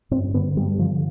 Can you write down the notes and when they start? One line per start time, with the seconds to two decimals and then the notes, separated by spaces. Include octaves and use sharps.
0.11 G2 C4
0.34 D3 B3
0.56 G2 G3
0.79 D3 F3